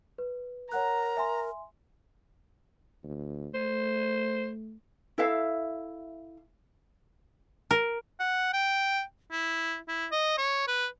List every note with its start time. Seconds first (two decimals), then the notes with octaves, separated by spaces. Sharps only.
0.18 B4
0.72 A#4 C#5 F#5 A#5 F#6
1.17 E5 G#5 C6
3.04 D2
3.54 A3 C5
5.18 E4 A4 E5 F5
7.71 A#4
8.19 F#5
8.53 G5
9.32 E4
9.88 E4
10.12 D#5
10.38 C#5
10.68 B4